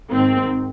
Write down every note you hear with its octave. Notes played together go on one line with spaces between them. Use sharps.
G#2 D#3 C4